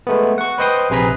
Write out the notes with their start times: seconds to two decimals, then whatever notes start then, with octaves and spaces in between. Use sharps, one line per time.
0.07 G#3 A3 B3
0.38 F#5 C#6
0.58 B4 C5 D#5 G5 C6 D#6
0.90 A#1 C3 G#4 B4 A#5 B6